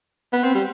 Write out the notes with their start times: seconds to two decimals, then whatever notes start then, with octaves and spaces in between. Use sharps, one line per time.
0.33 B3
0.44 C4
0.55 G3